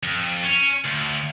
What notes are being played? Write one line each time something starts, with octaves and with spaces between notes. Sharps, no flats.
F2
C#4
D2